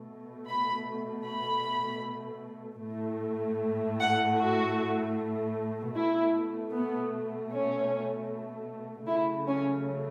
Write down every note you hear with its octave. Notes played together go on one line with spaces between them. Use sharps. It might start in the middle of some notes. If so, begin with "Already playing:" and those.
Already playing: B2 A3
B5
B5
A2 A3
F#5
F#4
B2 A3 E4
B3
C#4
C#3 F#3 A3 E4
C#4